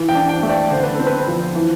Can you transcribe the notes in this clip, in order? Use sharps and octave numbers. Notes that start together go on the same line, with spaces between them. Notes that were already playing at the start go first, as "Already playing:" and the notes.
Already playing: E3
G5
D4
G5
A3
D5
D3 C5
B4
C4 A4
B4
F3
E3